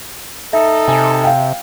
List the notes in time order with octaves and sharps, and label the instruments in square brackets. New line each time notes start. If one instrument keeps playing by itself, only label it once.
[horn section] D#4 A4 [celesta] E5
[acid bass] C3 [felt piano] G#5
[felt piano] F5 G5